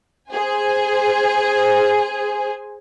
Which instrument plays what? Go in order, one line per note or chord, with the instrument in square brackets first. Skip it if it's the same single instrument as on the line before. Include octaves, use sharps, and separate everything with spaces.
[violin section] G#4 C5 G#5